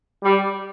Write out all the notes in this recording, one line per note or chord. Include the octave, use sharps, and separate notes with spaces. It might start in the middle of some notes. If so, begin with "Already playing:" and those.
G3